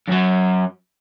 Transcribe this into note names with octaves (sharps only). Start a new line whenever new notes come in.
F#2 F#3